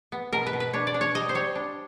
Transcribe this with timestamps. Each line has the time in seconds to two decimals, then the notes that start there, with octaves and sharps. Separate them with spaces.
0.12 B3
0.33 B2 A#4
0.46 B4
0.53 B2
0.60 B4
0.73 D4 C#5
0.87 D5
0.94 D4
1.01 C#5
1.14 G3 D#5
1.29 C5
1.35 G3 C#5
1.55 D4